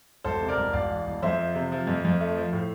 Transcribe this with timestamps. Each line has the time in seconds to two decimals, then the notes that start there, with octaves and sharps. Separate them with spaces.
0.24 E1 A4 C5
0.41 C3
0.48 A#4 D5
0.56 E1
0.73 E1 D5 F5
0.89 E2
1.07 E1
1.22 F2 C5 E5
1.39 F3
1.55 C3
1.72 F3
1.87 F2
2.04 F2
2.21 A3
2.37 F3
2.53 A2